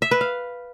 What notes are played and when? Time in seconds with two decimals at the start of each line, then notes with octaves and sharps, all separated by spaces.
0.02 E5
0.11 B4
0.21 F5